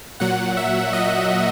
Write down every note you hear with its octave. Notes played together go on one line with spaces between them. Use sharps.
A#2 F#3 F#5
E5
D#5